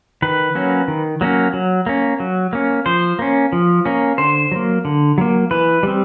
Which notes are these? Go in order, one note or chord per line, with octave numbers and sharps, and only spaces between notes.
D#3 B4
F#3 A#3 C#4
D#3
F#3 A#3 C#4
F#3
A#3 C#4
F#3
A#3 C#4
F3 C5
A#3 C#4
F3
A#3 C#4
D3 C5
F#3 A#3
D3
F#3 A#3
E3 B4
G3 C4